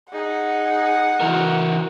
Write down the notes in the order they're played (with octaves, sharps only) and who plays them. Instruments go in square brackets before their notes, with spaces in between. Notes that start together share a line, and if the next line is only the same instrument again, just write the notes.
[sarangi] D#4 [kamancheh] G#4 [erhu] F#5
[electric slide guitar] E3 E4 A#4 [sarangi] F#4